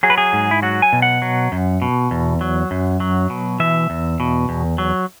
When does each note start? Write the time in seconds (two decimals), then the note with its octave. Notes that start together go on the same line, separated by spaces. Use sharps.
0.03 F#3 G#4
0.10 B4
0.18 G#4
0.33 G#2
0.51 E4
0.62 F#3 F#4
0.82 G#5
0.93 B2
1.02 F#5
1.22 F#3
1.52 F#2
1.82 B2
2.11 E2
2.41 F#3
2.71 F#2
3.00 F#3
3.30 B2
3.60 E3 E5
3.90 E2
4.20 B2
4.49 E2
4.78 F#3